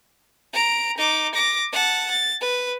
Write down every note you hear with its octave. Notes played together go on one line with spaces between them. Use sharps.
A#5 D7
D#4 D6
D6 A#6
F#5 A5
A6
B4